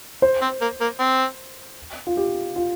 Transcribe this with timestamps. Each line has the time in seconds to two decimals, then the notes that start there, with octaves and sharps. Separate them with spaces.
0.22 C5
0.42 C4
0.61 A#3
0.81 A#3
1.00 C4
2.07 F4
2.17 G4
2.56 F4